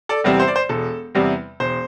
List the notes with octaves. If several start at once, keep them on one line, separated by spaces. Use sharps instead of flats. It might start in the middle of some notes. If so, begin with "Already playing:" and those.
A4 D5
E2 C3 G3 C4
C5
D5
C5
E1 A4
E2 C3 G3 C4
E1 C5